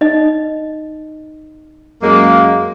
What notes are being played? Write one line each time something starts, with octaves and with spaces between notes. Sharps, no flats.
D#4 D#5
F#2 G#3 A#3